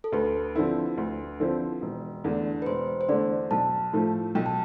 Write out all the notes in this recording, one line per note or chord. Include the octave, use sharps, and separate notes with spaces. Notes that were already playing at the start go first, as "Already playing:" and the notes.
A4
D2 B4
D3 F3 C4 E4
D2
D3 F3 C4 E4
E1
E2 D3 A3 D4
B4
E1 C5
C5
E2 D3 A3 D4 D5
B1 A5
A2 F3 A3
B1 G5
A5